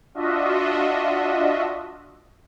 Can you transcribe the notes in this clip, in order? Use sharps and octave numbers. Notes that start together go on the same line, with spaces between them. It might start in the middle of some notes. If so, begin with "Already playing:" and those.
D4 F4 F#4 D#5 E5